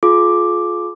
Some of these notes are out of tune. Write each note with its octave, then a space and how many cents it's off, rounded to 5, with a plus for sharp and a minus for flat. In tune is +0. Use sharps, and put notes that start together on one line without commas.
F4 +10 G#4 +45 D6 +0